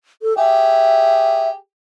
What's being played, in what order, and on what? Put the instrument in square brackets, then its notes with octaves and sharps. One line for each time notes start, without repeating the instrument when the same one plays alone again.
[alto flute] A4
[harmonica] G4 G#4 [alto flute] E5